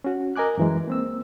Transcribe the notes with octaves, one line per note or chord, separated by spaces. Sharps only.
C#4 F#4
A#4 D#5 G#5 D6 F#6
F#2 E3 G#3
A#3 C4 E6